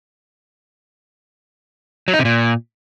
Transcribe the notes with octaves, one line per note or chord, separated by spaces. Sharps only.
F#3
D#4
C3
A#2